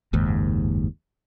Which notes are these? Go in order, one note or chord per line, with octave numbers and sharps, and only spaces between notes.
F#1 D#2 G#2